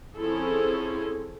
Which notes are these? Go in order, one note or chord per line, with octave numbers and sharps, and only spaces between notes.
F3 C4 C#4 E4 G#4 A4